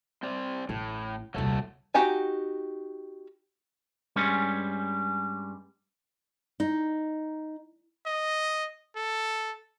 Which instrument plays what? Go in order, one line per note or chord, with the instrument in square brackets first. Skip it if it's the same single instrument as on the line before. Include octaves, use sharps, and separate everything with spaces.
[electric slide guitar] C4 C5 D5
[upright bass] A1 [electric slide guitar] A2
[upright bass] D#1 C2 [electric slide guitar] F#3 A3 A4
[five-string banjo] D#4 F#4 G4 G5 G#5
[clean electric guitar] G2 G3 G#3 C#4 C#5
[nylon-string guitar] D#4
[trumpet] D#5
A4